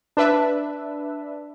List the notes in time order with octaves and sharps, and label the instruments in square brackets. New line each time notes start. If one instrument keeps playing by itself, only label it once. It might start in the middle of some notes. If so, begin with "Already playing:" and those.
[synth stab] D4 B4 E5